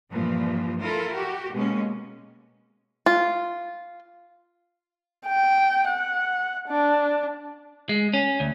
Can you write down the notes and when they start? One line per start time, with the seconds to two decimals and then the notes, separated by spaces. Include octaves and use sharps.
0.11 G2 A#2 E3 F3
0.82 E4 F4 A4 A#4
1.14 F#4 G4
1.53 B2 G#3 A#3 C#4
3.06 F4
5.27 G5
5.89 F#5
6.69 D4
7.89 G#3
8.13 C#4
8.40 D2